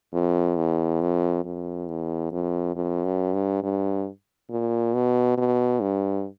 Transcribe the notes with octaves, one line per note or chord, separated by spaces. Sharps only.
F2
E2
F2
F2
E2
F2
F2
F#2
G2
G2
A#2
B2
B2
G2